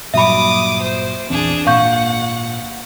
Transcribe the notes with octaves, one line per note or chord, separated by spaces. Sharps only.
G2 A#2 F#3 E5 B5 D6 D#6
C5
A#1 E2 C4 D4 G#4
G#1 A#2 F5 F#5 C#6 G6